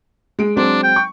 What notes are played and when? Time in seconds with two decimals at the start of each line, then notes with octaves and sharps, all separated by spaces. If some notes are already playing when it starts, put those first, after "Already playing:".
0.39 G#3 D7
0.57 F#3 G#3 C4 D4
0.83 G5
0.96 C#6